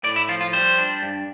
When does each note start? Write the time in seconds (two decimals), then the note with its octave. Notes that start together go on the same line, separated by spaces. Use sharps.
0.04 A2 D5
0.16 E4
0.28 F3 F4
0.41 F4
0.53 G3 C5
0.78 D4
1.03 G2